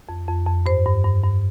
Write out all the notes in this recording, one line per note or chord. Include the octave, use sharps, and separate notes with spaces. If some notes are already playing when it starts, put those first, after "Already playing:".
F2
F2
F2
G2 C5
G2
G2
G2